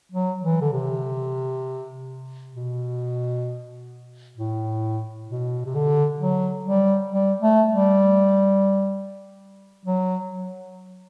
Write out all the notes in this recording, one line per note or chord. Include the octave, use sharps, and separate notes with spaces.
F#3
E3
D3
C3
B2
A2
B2
C3
D3
F#3
G3
G3
A3
G3
F#3